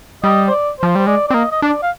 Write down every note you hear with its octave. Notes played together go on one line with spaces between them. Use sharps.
G3 D#5
C5
D5
F3 C5
G3 C5
G#3 D5
D5
C4
A#3 D#5
D#5
D4 D5
F5